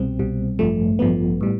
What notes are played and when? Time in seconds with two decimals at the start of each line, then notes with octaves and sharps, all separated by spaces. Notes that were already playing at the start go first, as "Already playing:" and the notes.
Already playing: C2 B2 G3 C4
0.19 C2 B2 G3
0.59 A1 G2 F3 A3
0.99 A1 G2 F3 B3
1.41 A2 G3